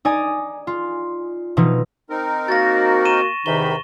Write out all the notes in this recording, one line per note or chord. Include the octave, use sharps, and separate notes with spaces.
D#4 D5 G#5 D#6
F4
B2 E3 F3 D#4
C4 D#4 A#4
A#3 F#4 A6 A#6
C#6 D#7 E7
E2 C3 D#3 D#4 B5 G7